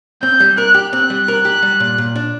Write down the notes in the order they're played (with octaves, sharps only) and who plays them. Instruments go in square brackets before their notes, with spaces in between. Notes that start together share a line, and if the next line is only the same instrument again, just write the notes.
[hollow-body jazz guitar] C4 [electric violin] G6
[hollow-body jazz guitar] G3
[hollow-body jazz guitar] A#4 [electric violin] F#6
[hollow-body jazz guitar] G4
[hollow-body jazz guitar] C4 [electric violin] F#6
[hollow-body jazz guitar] G3
A#4
G4
G3
A#2
A#2
D4